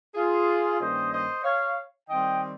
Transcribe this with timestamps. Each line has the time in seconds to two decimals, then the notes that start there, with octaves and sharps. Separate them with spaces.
0.15 F4 G#4
0.79 G2 D#3 A#3 C#4 C5 D#5
1.11 C5 D#5
1.43 C#5 F5
2.08 D#3 G3 C4 D#5 G5